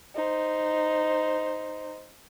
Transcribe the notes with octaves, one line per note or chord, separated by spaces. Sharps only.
D#4 C5